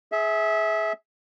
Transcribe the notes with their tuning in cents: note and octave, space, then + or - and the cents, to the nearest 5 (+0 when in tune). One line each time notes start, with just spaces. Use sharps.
G#4 +20 E5 -15